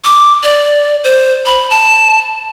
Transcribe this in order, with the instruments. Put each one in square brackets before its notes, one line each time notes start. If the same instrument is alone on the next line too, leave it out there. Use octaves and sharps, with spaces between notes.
[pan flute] D6
D5
C5
B5
A5